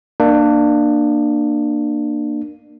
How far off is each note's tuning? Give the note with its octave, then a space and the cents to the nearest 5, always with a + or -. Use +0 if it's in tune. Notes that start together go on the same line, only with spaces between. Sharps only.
A#3 +0 D4 +25